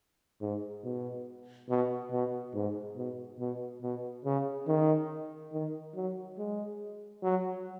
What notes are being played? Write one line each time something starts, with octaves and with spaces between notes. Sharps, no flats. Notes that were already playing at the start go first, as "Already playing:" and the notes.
G#2
B2
B2
B2
G#2
B2
B2
B2
C#3
D#3
D#3
F#3
G#3
F#3